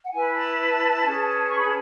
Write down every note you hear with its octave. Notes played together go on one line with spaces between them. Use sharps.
F#5
E4 B4 G#5
A5
C#4 G#4 B4
C#6
B5
A5